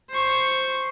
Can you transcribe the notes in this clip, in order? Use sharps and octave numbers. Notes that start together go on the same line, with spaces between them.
C5 C#6